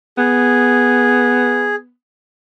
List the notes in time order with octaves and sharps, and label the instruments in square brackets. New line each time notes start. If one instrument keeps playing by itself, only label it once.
[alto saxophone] B3 [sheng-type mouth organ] G#4